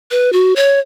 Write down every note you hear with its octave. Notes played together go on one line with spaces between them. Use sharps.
B4
F#4
C#5